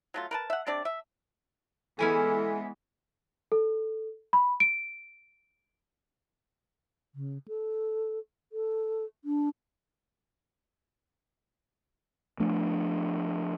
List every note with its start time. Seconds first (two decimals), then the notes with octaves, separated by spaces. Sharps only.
0.14 F#3 A3 F4
0.31 A#4 B4 A5
0.50 E5 F#5
0.67 C3 C4 D4 D5
0.85 E5
1.99 E3 G#3 B3 C#4 E4 A4 G#5
3.52 A4
4.33 B5
4.60 D7
7.15 C#3
7.48 A4
8.53 A4
9.25 D4
12.40 F3 A3 D4